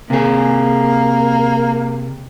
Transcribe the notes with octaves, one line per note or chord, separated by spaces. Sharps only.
C3 A#3 G#4